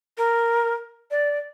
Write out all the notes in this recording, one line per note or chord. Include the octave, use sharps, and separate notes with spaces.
A#4
D5